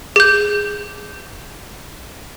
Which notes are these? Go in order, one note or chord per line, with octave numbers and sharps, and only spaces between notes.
G#4 G6